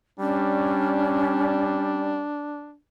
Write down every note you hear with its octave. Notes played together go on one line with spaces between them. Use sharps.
G3 C#4 D4